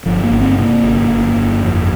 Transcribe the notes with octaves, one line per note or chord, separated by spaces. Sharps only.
G1 F3
A#3
G1
C4
C3 A#3
G1
G1
G1
F2